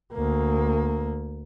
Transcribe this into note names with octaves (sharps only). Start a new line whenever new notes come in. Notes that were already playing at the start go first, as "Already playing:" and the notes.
D2 A#3